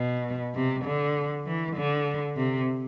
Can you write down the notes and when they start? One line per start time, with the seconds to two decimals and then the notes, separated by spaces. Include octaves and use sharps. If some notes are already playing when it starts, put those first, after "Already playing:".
Already playing: B2
0.55 C3
0.85 D3
1.47 E3
1.76 D3
2.37 C3